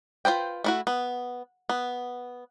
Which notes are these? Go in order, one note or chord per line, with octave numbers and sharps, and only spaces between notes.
F4 B4 C5 G5
A3 E4 F#4
B3
B3